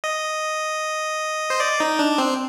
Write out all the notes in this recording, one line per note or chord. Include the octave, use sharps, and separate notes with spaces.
D#5
C5
D5
D#4
D4
C4